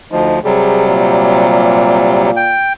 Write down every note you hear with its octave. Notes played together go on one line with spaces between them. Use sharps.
D2 F3 D#4
C3 F#3 G3 G#4
A#2
G5